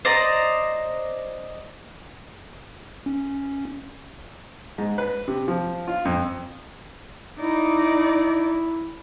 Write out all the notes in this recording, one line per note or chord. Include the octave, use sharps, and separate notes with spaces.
C5 D5 D#5 A#5
C#4
G#2
B4
C3
F3
F4
F2
D#4 E4 D5